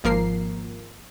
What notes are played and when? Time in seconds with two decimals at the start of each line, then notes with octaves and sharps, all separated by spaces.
0.04 G#1 F3 A#3 A#4 C7